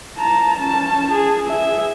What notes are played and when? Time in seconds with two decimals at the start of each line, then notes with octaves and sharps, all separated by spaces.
0.18 A5 A#5
0.60 C#4 A5
1.12 G#4
1.47 G#4 E5